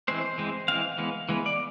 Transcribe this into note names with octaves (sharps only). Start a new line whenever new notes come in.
E3 G#3 C4 C5
E3 G#3 C4
E3 G#3 C4 F5
E3 G#3 B3
E3 G#3 B3
D5